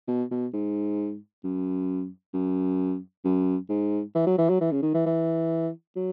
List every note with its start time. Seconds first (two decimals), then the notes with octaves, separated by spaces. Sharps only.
0.08 B2
0.31 B2
0.53 G#2
1.44 F#2
2.34 F#2
3.25 F#2
3.69 G#2
4.15 E3
4.26 F#3
4.38 E3
4.49 F#3
4.61 E3
4.72 C#3
4.82 D#3
4.94 E3
5.06 E3
5.96 F#3